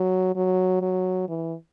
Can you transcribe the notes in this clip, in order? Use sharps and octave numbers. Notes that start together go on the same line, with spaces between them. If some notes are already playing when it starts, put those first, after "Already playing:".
Already playing: F#3
F#3
F#3
E3